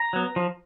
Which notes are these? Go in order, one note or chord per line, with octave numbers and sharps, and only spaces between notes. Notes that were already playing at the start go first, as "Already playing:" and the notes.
Already playing: A#5
F#3 B3
F3